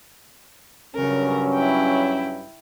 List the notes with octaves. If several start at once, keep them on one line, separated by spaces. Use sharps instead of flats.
G2 C#3 F#3 C#4 A#4
E4 G5